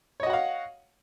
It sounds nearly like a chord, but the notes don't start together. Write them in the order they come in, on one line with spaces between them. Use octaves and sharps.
C#5 D#5 F#4 F#5 F5